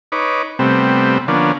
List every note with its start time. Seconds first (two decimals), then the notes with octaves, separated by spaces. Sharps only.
0.12 D#4 B4 C#5 D6
0.59 C3 G3 A3 B3 C4
1.28 D3 F3 A#3 B3 C#4 D4